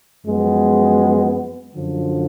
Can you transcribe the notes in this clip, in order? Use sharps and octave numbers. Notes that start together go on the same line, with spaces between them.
F#2 F3 G#3 B3
F#2 D3 F3